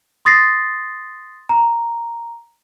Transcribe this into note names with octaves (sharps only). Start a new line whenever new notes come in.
C6 D#6 A6 A#6 C7
A#5